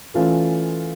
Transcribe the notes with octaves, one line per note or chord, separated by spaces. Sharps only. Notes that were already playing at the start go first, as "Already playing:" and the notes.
E3 A3 C#4 F4